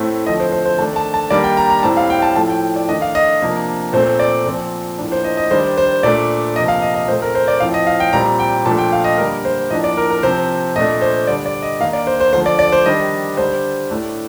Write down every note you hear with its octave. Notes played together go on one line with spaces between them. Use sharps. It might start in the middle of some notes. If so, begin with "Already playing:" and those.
Already playing: A2 A3 C4
D3 F3 A3 C4 D#5
C5
C5
C5
D#3 A3 D4 A5
A5
A5
D#3 G3 A#3 D4 D5
G5
A#5
A#5
A2 G3 C4 A5
F5
G5
A5
A2 F3 A3 A5
G5
D5
D#3 A3 D4 D#5
F5
D#5
C3 F3 A#3 D4
A#2 A3 C4 C5
D5
A#2 F3 C4
A2 F3 A#3 D4
C5
D#5
D#5
D#3 G3 D4 C5
C5
A#2 A3 D4 D5
C3 F3 A#3 D#5
F5
D#5
D#5
A#2 A3 C4 C5
A#4
C5
D5
A2 F3 C4 F5
D#5
F5
G5
A#2 G3 C4 A#5
G5
A#2 F3 A3 D4 A5
G5
F5
D#5
D3 G3 A#3 D4 A#4
C5
A2 F3 A#3 D4 D#5
D5
A#4
A#4
C3 F3 C4 C5
A#2 A3 D4 D#5
C5
D3 G3 D4 D5
D5
D#5
D#3 A#3 D4 F5
D5
C5
C5
D3 F3 A3 C5
D5
D5
C5
D#3 G3 D4 D#5
D3 G3 D4 C5
A2 A3 D4